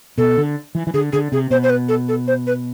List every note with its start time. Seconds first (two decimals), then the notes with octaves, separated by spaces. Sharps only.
0.18 B2 A4
0.37 D3
0.75 E3
0.87 E3
0.94 D3 G#4
1.12 D3 G#4
1.32 C3 G#4
1.50 B2 C5
1.63 C5
1.69 B4
1.88 A4
2.08 A4
2.27 C5
2.47 B4